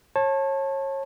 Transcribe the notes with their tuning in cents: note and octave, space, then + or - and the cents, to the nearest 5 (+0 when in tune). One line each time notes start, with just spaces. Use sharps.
C#5 -30 A5 +0